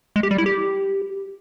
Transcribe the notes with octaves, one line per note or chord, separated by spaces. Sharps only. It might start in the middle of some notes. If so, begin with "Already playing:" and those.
G#3
G4
G3
E4
G4